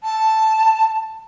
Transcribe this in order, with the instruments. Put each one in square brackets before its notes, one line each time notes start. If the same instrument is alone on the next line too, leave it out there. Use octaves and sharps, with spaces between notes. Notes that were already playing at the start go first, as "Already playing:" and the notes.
[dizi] A5